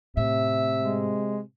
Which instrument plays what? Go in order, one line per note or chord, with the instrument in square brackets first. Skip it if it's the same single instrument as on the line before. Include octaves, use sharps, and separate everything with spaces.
[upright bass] A2 [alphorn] C3 [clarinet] E5
[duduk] G#3